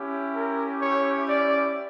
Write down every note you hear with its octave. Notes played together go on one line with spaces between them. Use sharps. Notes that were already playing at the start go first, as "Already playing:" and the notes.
Already playing: C#4 E4 G4
A#4
C#5
D5